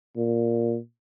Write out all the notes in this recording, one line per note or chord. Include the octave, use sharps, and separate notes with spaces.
A#2